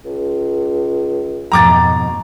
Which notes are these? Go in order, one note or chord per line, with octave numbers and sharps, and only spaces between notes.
C#2
F2 G#2 B2 A#5 D6 A6